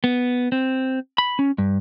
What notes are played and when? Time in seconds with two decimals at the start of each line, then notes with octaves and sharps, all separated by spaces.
0.04 B3
0.52 C4
1.18 B5
1.39 C#4
1.58 G2